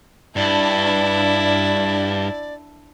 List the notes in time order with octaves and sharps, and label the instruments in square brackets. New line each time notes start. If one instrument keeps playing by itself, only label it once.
[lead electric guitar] G2 [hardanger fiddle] D4 E4 [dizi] D5